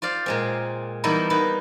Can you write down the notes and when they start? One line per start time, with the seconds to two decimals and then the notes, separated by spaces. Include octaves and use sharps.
0.02 F4 C5 D5 F5
0.26 A#2 G#3 C4
1.04 E3 G3 A#3 B3 D#4 E4
1.30 A#3 B3 D#4 B4